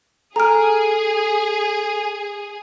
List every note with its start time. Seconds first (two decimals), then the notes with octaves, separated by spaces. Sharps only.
0.36 G#4 A4 G#5 A#5 F6 D7